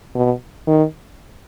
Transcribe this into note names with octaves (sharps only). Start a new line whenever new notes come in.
B2
D#3